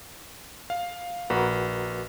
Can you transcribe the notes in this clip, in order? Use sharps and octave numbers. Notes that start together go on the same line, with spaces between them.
F5
A#1 F#4 A#4 B4